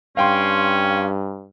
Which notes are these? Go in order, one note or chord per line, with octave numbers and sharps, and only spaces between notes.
G2 C#4 F5 G5 C6